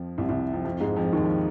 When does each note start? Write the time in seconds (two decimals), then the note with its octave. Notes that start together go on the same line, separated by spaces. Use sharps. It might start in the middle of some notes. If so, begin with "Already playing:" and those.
Already playing: F2 F3
0.18 C2 C3
0.29 C2 C3
0.53 F2 F3
0.65 F2 F3
0.80 G#2 G#3
0.96 F2 F3
1.12 D#2 D#3
1.24 F2 F3